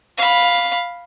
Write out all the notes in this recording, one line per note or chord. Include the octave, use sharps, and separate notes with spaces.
F5 B5